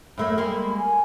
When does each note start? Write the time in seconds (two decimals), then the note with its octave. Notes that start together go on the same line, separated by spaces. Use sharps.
0.18 F#2 A3 A#3 B5
0.38 G3 G#3 A#3
0.78 G#5